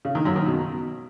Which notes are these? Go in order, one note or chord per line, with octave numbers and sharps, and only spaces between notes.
C#3
D#3
F#2
D#3
B2